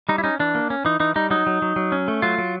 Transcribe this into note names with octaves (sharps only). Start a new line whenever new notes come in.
G3 D#4
E4
C#4 D#4
E3 D4
A#3
C#4
E3 D#4
E3 D#4
G3 D#4
F#3 D#4
F#3
F#3
F#3
C#4
A3
F#3 F4
F#3